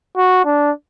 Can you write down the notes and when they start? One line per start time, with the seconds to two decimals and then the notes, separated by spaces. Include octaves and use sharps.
0.17 F#4
0.45 D4